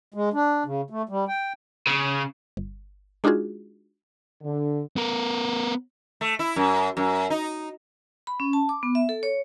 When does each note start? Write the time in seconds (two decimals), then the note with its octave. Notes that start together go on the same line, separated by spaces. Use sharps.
0.14 G#3
0.33 D4
0.66 C#3
0.90 A3
1.09 G3
1.28 G5
1.87 C#3
2.57 G1
3.24 G#3 D4 D#4 F4 F#4 G#4
4.43 D3
4.97 B3 A#4
6.21 A3
6.39 E4
6.56 F#2
6.97 F#2
7.30 D#4
8.27 B5
8.40 C#4
8.53 A5
8.69 D6
8.83 B3
8.95 E5
9.09 A4
9.23 C#5